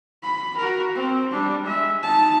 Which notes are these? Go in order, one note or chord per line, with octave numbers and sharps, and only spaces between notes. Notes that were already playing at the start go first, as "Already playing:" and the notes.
B5
F#4 A#4
C4
G3 D4
G#3 E5
D#4 A5